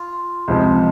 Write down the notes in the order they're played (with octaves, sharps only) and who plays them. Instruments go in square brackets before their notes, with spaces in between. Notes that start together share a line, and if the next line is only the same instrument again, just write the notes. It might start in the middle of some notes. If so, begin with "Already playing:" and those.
Already playing: [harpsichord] F4
[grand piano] C#2 C3 F3 G#3